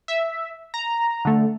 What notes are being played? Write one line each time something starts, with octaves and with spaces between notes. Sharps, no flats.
E5
A#5
D3 A3